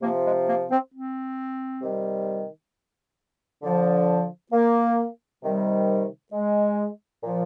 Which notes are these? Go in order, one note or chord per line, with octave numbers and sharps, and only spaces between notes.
C3 F3 A#3
G#3
A#3
C4
C4
C3 D#3 G3
D3 F3
A#3
C3 D#3 G3
G#3
A#2 F3